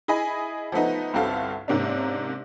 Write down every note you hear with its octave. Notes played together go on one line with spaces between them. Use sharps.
E4 G#4 D#5 G#5 B5
F3 A3 B3 D#4
G1 C2 C4 F#4 A4 F5
G#2 C3 A#3 C#4 D4